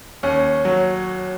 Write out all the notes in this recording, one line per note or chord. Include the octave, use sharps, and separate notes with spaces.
D#2 C#4
F#3